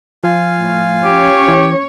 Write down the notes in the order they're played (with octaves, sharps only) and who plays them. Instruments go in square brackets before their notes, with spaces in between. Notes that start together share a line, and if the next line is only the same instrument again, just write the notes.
[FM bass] F3 [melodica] F4 F5 G#5
[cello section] A2
[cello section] C#4 C#5 [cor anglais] G4
[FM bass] E3